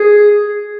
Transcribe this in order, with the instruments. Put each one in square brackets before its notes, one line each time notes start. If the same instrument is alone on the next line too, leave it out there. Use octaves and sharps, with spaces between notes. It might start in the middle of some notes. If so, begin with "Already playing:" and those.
Already playing: [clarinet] G#4